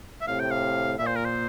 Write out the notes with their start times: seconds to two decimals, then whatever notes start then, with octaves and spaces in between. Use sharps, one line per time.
0.21 E5
0.27 A2 C3 F5
0.40 G5
0.51 F5
0.99 A#2 E5
1.06 C5
1.16 A#4
1.25 C5